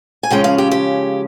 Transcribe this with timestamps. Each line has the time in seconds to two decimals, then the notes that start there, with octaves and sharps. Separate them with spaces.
0.23 G#5
0.30 C#3 F3 G#3 C#4 G5
0.44 F5
0.58 G4
0.71 G4